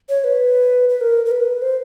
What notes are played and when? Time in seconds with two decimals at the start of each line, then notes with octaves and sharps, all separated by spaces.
0.09 C#5
0.24 B4
0.89 B4
1.01 A#4
1.26 A#4
1.31 B4
1.62 C5